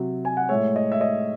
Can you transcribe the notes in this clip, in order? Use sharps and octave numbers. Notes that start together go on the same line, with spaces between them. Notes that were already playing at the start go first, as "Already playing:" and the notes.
Already playing: C3 F#3
G#5
F#5
A2 G#3 C#5 E5
D#5
E5
D#5